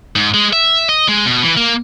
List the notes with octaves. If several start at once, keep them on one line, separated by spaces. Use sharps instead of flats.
G#2
G#3
E5
D#5
G#3
B2
E3
A#3